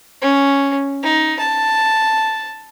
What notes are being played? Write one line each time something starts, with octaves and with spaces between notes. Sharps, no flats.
C#4
D#4
A5